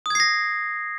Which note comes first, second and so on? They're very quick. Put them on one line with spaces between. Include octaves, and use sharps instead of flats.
D#6 G#6 C7 A#6